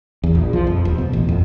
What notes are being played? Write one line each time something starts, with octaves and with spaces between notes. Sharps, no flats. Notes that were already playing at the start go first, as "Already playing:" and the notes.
E2
A#1
F3
F2
D#1
B2
A1
F2